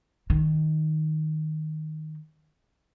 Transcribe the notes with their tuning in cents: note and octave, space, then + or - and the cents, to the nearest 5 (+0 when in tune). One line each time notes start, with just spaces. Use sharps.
D#3 +0 D#4 +0